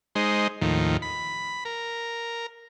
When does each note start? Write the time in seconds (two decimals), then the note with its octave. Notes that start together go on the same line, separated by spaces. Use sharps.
0.15 G#3 D#4 C5
0.62 D#2 A2 D#3 F3
1.02 B5
1.65 A#4